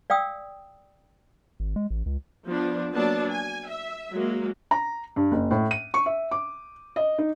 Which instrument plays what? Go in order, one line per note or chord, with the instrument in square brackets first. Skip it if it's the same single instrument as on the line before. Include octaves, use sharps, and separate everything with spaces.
[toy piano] D5 F5 G5 D#6 E6
[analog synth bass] G#1
G#3
A1
C#2
[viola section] F3 B3 D4
F#3 A#3 B3 D4 A5
G#5
E5
F#3 G#3 A#3
[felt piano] A#5
G2
F#1
A2
D#7
C#6
E5
D6
D#5
D#4